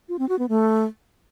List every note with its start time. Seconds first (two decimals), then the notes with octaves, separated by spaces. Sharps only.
0.09 F4
0.19 C4
0.29 F#4
0.39 B3
0.49 A3